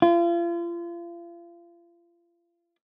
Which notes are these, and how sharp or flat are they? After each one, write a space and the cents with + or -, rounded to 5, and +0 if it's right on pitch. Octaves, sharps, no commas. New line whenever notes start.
F4 -35